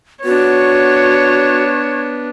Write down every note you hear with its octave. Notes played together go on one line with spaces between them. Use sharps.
B3 D4 F#4 C#5